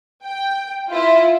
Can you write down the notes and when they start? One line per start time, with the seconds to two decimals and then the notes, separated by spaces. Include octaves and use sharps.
0.24 G5
0.89 E4 F4